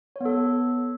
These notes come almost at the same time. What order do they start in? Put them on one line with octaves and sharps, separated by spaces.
C#5 B3 A4